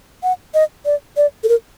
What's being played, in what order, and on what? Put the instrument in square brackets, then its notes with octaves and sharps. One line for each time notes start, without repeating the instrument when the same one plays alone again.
[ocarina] F#5
D#5
D5
D5
A4
A#4